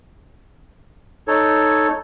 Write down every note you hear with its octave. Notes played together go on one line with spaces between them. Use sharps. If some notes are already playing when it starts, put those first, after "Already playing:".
D#4 A4 C#5